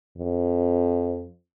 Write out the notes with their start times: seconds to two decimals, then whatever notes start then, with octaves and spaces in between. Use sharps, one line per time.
0.18 F2